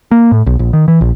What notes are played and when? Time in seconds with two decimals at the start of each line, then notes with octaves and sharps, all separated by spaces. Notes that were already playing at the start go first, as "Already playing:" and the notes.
0.11 A#3
0.32 A2
0.46 B1
0.59 A#1
0.73 D#3
0.88 E3
1.01 A#1